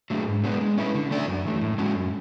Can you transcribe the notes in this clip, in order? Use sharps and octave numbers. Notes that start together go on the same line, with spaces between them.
F#3 A3 D4 G#4
G#2
G#3 B3 D4
G#3
C#4 E4 B4
D3
A3 D4 A4 D5
F#2
E3 A3
A2
G#3 C#4 F#4
F#2